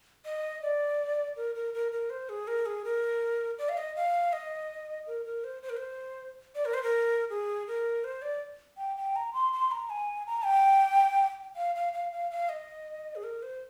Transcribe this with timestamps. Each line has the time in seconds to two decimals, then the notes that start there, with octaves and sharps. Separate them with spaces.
0.25 D#5
0.62 D5
1.36 A#4
1.55 A#4
1.74 A#4
1.92 A#4
2.10 C5
2.29 G#4
2.47 A#4
2.66 G#4
2.84 A#4
3.58 D5
3.69 F5
3.77 D#5
3.96 F5
4.33 D#5
5.07 A#4
5.25 A#4
5.44 C5
5.63 C5
5.69 A#4
5.77 C5
6.55 D5
6.65 A#4
6.74 C5
6.83 A#4
7.30 G#4
7.67 A#4
8.04 C5
8.22 D5
8.77 G5
8.97 G5
9.16 A#5
9.33 C6
9.53 C6
9.71 A#5
9.90 G#5
10.27 A#5
10.45 G5
11.56 F5
11.75 F5
11.93 F5
12.12 F5
12.31 F5
12.49 D#5
13.15 G#4
13.24 A#4
13.42 C5